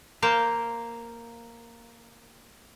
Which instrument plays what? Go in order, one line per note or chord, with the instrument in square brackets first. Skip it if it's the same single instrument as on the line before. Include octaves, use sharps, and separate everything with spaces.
[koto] A#3 C5 F5